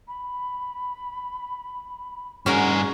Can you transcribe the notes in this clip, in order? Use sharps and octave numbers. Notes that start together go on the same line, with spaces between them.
B5
G2 C#4 F#4 G#4 A#4